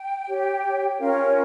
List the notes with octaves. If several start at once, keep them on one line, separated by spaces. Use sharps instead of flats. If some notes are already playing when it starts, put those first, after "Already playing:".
Already playing: G5
G4 C#5
G5
C#4 F4 A#4 C#5 F5